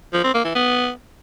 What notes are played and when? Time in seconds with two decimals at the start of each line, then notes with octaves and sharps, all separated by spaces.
0.14 F3
0.24 C4
0.34 A#3
0.45 E3
0.55 B3